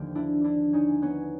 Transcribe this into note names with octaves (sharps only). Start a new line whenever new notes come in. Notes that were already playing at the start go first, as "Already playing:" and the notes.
Already playing: D#2 D3 F3 G4
D4 E4
D4 E4
C#4 D#4
B3 C#4